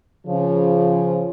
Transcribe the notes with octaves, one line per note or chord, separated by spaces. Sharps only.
C#3 F3